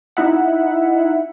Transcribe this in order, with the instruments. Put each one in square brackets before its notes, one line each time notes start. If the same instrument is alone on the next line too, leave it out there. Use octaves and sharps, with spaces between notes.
[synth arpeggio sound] D#4 E4 E5 F#5